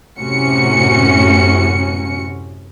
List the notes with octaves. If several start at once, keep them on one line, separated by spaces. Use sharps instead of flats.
F#2 A2 C3 C#4 F#4 C#7